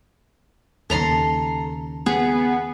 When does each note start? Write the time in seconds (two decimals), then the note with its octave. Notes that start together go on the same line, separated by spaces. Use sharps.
0.90 D#2 C#3 A4 A#5 C6
2.06 B3 G#4